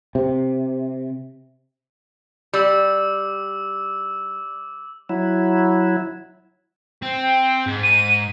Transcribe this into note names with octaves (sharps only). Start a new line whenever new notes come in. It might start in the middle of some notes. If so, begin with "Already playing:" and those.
C3
G3 D6 E6
F#3 E4
C4
G5
G#2
D#7